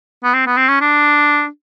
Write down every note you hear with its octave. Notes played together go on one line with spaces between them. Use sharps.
B3
C4
B3
C4
C#4
D4